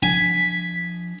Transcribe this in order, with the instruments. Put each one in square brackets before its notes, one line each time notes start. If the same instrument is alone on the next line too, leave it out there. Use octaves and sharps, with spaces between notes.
[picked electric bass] F3 D4 [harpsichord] G#5 [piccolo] B6